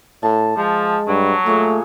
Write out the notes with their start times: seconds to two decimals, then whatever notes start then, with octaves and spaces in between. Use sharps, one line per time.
0.23 A2 A5
0.57 F3 G#3
1.08 G2 F#3
1.46 A#2 G#3 A3 C#5